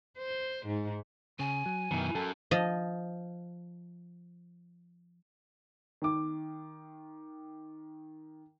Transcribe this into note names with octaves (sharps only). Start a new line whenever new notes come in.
C5
G#2
C#3 G#5
F#3
F#2 B2 D#3 E3
F#2 A4
F3 D#5
D#3 D6